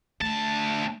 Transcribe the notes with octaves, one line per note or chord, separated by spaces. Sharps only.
D2 A3 A5